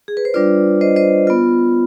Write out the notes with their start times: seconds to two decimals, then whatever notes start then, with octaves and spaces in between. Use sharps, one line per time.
0.08 G#4
0.17 B4
0.25 C5
0.34 G3 D4 F4 B4 D5
0.81 C5 D#5
0.96 C5 D#5
1.27 B3 F4